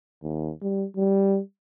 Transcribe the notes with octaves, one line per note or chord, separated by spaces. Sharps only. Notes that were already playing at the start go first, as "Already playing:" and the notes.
D#2
G3
G3